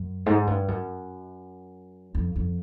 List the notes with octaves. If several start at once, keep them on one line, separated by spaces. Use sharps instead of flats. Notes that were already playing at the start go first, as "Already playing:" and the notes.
Already playing: F#2
G#2
G2
F#2
F2
F2